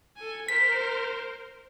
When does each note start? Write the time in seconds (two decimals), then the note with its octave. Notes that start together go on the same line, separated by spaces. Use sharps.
0.17 A4 G#5
0.48 A#4 C5 B6